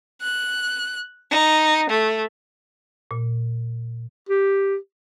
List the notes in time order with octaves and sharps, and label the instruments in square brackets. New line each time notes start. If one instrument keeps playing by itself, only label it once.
[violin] F#6
D#4
A3
[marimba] A#2
[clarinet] G4